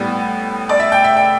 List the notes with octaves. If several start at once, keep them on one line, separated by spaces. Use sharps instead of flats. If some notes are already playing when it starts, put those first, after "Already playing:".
Already playing: A2 G3 B3
D5
E5
G5
E5
G5